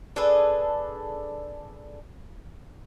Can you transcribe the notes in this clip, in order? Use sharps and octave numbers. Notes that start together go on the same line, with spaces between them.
D4 G#4 A4 B4